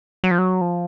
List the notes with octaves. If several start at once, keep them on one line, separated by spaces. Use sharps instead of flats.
F#3
F3
F#3
F3